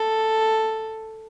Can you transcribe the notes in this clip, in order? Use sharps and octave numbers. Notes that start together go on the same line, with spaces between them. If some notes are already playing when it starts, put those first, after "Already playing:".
Already playing: A4